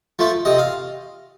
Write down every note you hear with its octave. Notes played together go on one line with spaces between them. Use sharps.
F3 A3
C3 D#5
F5